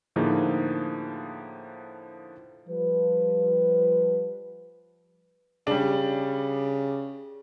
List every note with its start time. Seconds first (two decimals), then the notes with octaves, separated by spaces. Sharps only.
0.16 A2 D3 F3 A#3 D#4 G#4
2.68 F3 G3 B4
5.67 C#3 G3 D4